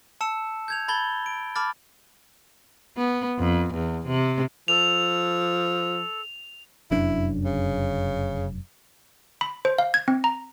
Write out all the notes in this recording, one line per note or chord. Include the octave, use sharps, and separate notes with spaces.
A5 E6 C#7 E7
G6 G#6 F7
A5 B5 G#6 A6 G7
D7
A5 B5 D6 F6 A6
B3
F2
E2
C3
F3 A4 F7
F1 F#2 D4 E4
C#3
B5
C5
F5
G#6
C4
A#5